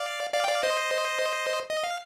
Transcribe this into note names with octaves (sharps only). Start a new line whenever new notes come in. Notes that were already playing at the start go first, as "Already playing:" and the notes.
Already playing: D5 F5
D5 F5
G5
D5 F5
C5 D#5
D#5
F5